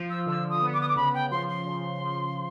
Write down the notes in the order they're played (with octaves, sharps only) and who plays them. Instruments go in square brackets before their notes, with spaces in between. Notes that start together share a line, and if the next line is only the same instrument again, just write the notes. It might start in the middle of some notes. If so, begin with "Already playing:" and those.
Already playing: [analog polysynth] F3
[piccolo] E6
[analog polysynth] D3 [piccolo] E6
[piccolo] D#6
[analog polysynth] B3
[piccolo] D6
D#6
D6
[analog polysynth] C#3 [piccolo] B5
[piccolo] G5
[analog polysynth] F3 [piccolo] C6
[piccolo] C6
[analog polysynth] C#3
F3